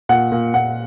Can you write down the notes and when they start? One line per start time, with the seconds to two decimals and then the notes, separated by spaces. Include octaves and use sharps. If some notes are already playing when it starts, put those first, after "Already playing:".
0.09 A#2 F#5
0.32 A#2
0.54 A#2 F#5